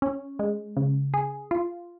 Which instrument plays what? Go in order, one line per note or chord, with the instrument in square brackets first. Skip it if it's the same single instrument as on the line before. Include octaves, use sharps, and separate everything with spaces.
[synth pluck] C#4
G#3
C#3
G#4
F4